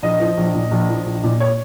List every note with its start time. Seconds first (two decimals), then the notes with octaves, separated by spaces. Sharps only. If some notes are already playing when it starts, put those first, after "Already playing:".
0.02 A#1 D#5
0.20 F3
0.37 A#1
0.54 A#2
0.71 A#1
0.89 F3
1.06 A#1
1.24 A#2
1.40 C#5